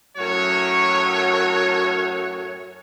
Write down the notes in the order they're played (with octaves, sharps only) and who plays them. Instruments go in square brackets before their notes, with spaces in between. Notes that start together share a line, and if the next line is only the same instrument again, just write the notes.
[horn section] F#2 A2 F#3 F#4 C#5